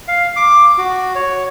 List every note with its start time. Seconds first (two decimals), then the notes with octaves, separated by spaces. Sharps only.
0.08 F5
0.36 D6
0.78 F#4
1.15 C#5